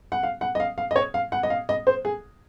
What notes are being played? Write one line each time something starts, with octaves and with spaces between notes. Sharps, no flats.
F#5
F5
F#5
D#5
F5
F5
D#5
C#5
F5
F#5
D#5
F5
D#5
C5
G#4